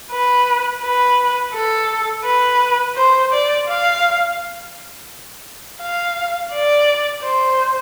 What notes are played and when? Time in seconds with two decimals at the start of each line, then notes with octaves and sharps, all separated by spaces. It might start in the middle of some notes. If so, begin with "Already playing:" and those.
0.11 B4
0.83 B4
1.54 A4
2.25 B4
2.96 C5
3.32 D5
3.68 F5
5.81 F5
6.53 D5
7.23 C5